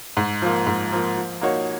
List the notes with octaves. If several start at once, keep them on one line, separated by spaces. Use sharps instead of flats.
G#2
F3 A#3
G#2
F3 A#3
F3
A#3 D#4 F#4 C#5